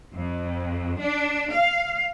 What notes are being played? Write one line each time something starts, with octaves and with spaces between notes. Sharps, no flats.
F2
D4
F5